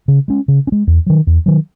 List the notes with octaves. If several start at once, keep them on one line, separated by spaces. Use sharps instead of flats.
C#3
G#3 C#4
C#3
C#4
G#3
E2
D#3 F#3
E2
D#3 F#3